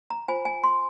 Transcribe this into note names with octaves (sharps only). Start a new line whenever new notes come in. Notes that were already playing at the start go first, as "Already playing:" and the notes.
A#5
F4 C5 G#5
G#5
C6